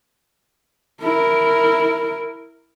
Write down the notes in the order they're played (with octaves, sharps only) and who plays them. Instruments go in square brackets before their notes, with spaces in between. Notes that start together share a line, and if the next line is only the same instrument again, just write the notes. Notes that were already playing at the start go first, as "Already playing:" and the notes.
[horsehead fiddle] E4 A#4